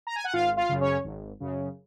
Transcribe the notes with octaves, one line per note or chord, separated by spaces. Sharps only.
A#5
G#5
F#5
G#1 F4 F5
F4 F5
F#2 C#3
C#4 C#5
G#1
F#2 C#3